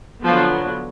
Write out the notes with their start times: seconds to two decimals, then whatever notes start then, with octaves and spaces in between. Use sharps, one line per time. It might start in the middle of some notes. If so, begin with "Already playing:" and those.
0.24 D3 F3 F#3 B3 F4